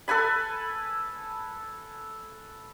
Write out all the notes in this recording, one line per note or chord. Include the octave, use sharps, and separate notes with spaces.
A4 B4 G#5 B5